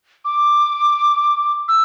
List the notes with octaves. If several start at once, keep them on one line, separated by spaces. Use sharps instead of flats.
D6
E6